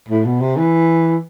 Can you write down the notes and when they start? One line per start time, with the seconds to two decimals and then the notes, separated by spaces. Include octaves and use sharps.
0.08 A2
0.25 B2
0.40 C3
0.57 E3